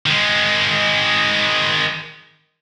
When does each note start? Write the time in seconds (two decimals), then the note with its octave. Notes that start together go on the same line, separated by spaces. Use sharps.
0.06 D#3 G#3